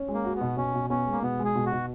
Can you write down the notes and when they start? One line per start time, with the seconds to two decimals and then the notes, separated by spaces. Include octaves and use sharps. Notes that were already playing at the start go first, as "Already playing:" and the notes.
Already playing: C#4
0.08 G#3
0.14 A#3
0.25 F#4
0.36 B3
0.41 B2
0.57 B2 C#4
0.74 B2
0.90 B3 C#4
1.06 G#3
1.12 A#3
1.22 B2 B3
1.39 G#3
1.45 G#4
1.55 B2
1.66 F#4
1.72 B2